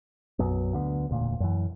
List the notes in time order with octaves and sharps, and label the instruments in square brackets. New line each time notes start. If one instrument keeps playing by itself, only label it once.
[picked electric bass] B1 F#2 F#3 B3
D2 D3 B3
E1 D2 A#2
F#2 E3